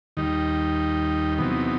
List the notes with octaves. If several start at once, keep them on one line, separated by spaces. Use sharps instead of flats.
D#2 D#3 G3 D#4
E2 C3 F#3 B3 D#4